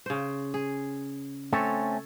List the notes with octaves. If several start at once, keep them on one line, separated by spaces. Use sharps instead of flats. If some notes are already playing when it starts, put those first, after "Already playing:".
C#3 C5
G#4
A3 C4 C#4 A4 C#5